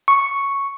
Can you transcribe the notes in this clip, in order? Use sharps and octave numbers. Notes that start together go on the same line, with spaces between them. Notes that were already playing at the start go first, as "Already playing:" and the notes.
C#6